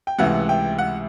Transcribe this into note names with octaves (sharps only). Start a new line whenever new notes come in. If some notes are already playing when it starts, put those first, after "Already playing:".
G5
C#2 C3 E3 A3 F#5
G5
F#5